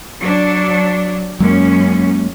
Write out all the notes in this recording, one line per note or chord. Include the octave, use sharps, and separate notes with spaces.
F#3 D4
F#2 F#3 G#3 A#3 C#4